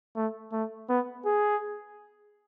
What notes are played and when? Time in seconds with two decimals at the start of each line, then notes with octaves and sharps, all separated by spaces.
0.16 A3
0.53 A3
0.89 B3
1.25 G#4